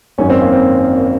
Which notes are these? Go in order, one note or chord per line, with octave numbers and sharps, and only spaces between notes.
G#1 F#2 D#3 C#4
C4
A#3
C4